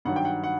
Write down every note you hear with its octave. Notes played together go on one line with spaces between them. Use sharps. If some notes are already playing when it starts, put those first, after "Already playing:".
G2 D#3 F#3 F#5
G5
F#5
F#5